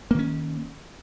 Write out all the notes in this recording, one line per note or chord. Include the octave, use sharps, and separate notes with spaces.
D#3 A#3 C#4